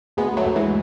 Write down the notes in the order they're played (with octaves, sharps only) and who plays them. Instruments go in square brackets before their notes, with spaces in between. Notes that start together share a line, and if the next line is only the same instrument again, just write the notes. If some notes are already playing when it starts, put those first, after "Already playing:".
[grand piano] D2 [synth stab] G#3 B3
[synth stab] F#3 A3
[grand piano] D2
[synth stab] E3 G#3